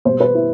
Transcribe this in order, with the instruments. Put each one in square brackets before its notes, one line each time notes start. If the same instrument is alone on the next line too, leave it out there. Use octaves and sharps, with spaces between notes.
[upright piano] B2 G3 C5
B4
E4